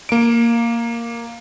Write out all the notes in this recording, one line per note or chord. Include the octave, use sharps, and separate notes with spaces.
A#3 D7